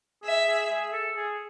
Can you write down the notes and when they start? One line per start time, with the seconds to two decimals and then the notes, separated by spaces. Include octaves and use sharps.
0.23 G#4 E5
0.47 G#4
0.70 G#4
0.92 A4
1.16 G#4